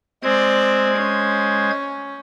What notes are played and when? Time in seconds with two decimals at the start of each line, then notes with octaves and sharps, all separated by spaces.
0.23 G#3 C4 C5 D5 G#6
0.97 C#4